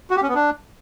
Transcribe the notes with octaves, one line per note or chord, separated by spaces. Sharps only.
F#4
G4
C#4
B3
D4